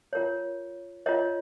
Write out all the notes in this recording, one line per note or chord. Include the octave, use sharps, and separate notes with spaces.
F4 A#4 C#5
F4 A#4 C#5 D#5